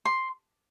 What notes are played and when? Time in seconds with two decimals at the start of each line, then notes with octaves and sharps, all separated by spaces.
0.05 C6